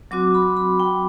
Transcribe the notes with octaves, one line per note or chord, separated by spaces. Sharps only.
F#3 C4 F#4 D6
B5
B5
G5